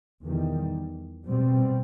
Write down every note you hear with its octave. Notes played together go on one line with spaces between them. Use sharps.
E2 D#3 G3
B2 G3 C4